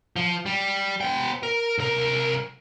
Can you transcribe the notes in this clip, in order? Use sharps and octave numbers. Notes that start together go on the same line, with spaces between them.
F3
G3
B3 G5
A#4
C2 A#4